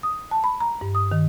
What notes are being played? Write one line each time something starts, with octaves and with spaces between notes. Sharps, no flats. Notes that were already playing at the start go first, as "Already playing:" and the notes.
D#6
A5
B5
A#5
G2
D#6
D#3